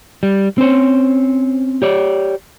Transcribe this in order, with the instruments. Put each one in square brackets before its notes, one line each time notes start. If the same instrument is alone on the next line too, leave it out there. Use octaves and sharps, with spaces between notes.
[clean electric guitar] G3
C4 C#4 C5 C#5
G4 C#5 D5